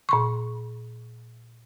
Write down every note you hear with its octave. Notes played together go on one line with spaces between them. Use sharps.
A#2 C6 C#6